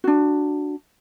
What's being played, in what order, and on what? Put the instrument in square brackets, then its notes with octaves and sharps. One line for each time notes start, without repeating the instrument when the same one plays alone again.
[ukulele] D4 F#4